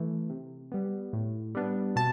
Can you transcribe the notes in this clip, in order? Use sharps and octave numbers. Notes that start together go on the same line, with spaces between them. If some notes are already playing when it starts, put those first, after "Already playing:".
Already playing: E3 A3
C3
G3 B3
A2
G3 B3 D4
B2 A5